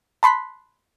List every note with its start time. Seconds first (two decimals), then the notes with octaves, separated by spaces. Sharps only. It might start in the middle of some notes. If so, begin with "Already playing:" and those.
0.23 A5 B5 C6 F#6 B6